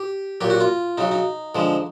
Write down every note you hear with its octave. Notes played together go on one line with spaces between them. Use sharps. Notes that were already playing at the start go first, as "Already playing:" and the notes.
Already playing: G4
A#2 F#3 G4
F#4
F4
C#3 F#3 D#4
D#4
D3 F3 G#3